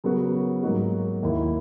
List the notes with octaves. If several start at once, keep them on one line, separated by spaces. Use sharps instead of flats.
C#3 F#3 B3 F#4 A#4
G#2 F#3 A#3 D#4 F#4
D#2 D#3 A#3 E4